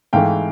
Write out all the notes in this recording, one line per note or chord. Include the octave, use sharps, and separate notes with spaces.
G#2 E3 A3 F5 G5